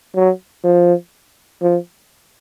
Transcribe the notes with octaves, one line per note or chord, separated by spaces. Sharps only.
F#3
F3
F3